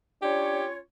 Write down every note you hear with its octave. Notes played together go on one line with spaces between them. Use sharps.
C#4 D4 F4 G4 C#5